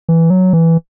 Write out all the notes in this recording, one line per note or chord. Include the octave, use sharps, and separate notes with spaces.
E3
F#3
E3